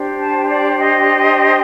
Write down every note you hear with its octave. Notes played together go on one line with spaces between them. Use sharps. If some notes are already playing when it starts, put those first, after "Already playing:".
Already playing: D4 G4 C5
A5
D5
D#5